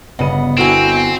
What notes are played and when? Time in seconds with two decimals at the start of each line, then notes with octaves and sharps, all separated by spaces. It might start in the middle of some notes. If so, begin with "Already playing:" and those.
0.19 G1 C#3 B3 D#5 F#5 D#7
0.57 D3 C4 E4 F#4 G#5